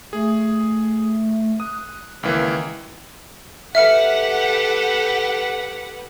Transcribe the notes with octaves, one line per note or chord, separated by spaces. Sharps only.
A3 G#4
D#6 F#6
C#2 D#3 E3 A#3
G4 A4 B4 E5 F#5 F6 C#7